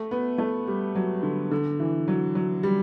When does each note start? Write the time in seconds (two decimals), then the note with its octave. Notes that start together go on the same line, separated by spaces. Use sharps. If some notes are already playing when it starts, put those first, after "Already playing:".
Already playing: A3
0.11 B3
0.38 A3
0.68 G3
0.95 F#3
1.23 D3
1.51 D3
1.80 E3
2.08 F#3
2.35 F#3
2.63 G3